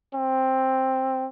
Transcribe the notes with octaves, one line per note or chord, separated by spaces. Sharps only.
C4